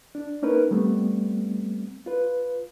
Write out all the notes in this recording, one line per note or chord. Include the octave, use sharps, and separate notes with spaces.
D4
A#3 C#4 D#4 A#4 B4
G3 A3 B3 C4
F4 B4